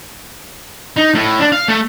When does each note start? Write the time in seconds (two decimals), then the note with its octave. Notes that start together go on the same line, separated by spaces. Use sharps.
0.97 D#4
1.15 A2
1.40 D4
1.52 F5
1.68 A3